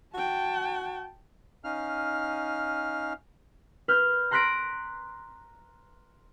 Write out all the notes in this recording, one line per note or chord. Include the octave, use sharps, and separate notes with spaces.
F#4 G5 A5
C#4 D#4 F5 F6
B4 F6 G6
A#5 C6 F#6 A#6 B6 D7